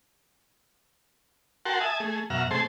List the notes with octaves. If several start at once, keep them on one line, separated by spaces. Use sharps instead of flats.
F#4 A#4 F#5 G5 A5 C6
E5 G#5 A5 D#6
A3 G#4
F#2 B2 E5 F#5 A#5 F6
C3 A3 G#4 C5 A5 C6